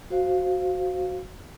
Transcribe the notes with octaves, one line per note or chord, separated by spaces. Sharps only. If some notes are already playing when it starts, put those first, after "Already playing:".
F#4 C5 F5